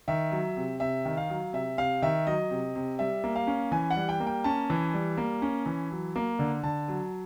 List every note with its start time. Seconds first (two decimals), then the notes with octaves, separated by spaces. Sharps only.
0.08 D#3 E5
0.31 F#3
0.57 C3
0.80 C3 E5
1.05 D#3
1.17 F5
1.30 F#3
1.53 C3 E5
1.78 C3 F5
2.02 D#3 E5
2.27 F#3 D#5
2.51 C3
2.75 C3
2.99 G3 E5
3.24 A#3
3.36 F5
3.47 C#4
3.71 E3 G#5
3.91 F#5
3.96 G3
4.09 G5
4.20 A#3
4.26 G5
4.44 C#4 A5
4.70 E3
4.93 G3
5.18 A#3
5.42 C#4
5.66 E3
5.91 F#3
6.16 A#3
6.39 D3
6.63 D3 A5
6.88 F#3